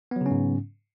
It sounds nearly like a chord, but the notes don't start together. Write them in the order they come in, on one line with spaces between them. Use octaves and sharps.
B3 F#3 C#3 C#4 G#2